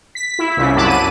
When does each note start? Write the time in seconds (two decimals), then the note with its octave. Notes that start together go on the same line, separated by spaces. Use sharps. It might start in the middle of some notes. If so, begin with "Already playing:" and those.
0.15 B6
0.39 E4
0.57 C2 C#3
0.76 F#2 A#2 F#3 A5 B5 D6
0.88 D#7